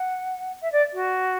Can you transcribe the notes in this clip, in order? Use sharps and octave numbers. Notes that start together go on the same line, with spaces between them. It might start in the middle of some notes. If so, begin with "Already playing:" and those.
Already playing: F#5
E5
D5
F#4